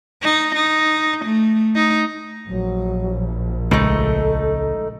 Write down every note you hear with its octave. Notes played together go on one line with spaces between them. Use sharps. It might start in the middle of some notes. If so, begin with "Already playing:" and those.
D#4
D#4
A3
D#4
A#1 F#3
C#2 A#2 A3 D#4 A4